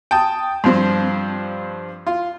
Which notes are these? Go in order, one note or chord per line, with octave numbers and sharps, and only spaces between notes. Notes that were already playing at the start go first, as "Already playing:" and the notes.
G5 A5 D#6
G2 F3 C4
F4